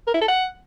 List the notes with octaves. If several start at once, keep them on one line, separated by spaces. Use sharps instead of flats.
A#4
E4
A4
F#5